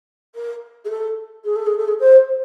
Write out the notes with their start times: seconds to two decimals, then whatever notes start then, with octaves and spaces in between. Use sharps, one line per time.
0.35 A#4
0.84 G#4
0.89 A4
1.44 G#4
1.55 A4
1.66 G#4
1.77 A4
1.88 G#4
1.99 C5